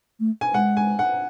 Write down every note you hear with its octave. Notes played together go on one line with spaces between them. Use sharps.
A3
G#5
G#3 F#5
G#5
F#5